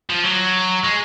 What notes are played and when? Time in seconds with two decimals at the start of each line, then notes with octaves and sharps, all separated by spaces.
0.10 F3
0.24 F#3
0.84 G#3